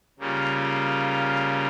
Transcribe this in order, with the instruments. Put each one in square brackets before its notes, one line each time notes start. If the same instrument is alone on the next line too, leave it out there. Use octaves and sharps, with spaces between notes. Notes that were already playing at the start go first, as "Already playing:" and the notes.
[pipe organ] C#3 G3 A#3 F4